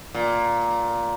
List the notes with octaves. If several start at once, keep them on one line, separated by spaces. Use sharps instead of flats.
A#2